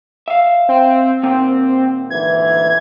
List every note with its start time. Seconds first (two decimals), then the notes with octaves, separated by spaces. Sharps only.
0.28 E5 F5
0.69 C4
1.23 D#2 A#2 C4
2.10 D2 G#2 E3 G#6